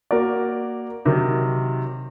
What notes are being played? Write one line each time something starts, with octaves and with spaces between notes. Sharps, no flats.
A#3 F#4 A#4 D5
C3 D#3 F#3